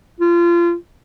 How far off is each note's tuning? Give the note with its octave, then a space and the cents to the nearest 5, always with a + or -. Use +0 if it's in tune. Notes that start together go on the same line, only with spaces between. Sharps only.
F4 -25